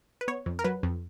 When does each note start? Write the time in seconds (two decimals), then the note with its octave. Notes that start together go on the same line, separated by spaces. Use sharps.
0.21 B4
0.28 B3 C#5
0.46 F2
0.59 A#4
0.64 F#3 B4
0.83 F2